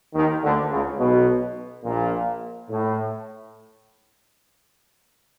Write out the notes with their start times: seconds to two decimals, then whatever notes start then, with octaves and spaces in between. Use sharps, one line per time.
0.14 D#2 D#3
0.43 D2 D3
0.71 C#2 C#3
0.99 B1 B2
1.84 A#1 A#2
2.69 A2